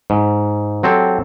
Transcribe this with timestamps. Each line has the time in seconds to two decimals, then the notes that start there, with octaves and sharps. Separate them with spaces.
0.10 G#2
0.83 F#3 C4 G4 A4